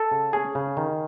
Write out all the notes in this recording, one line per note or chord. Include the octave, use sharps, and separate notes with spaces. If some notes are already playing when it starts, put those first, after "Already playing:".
Already playing: A4
C#3
C#4 G#4
C#3
D#3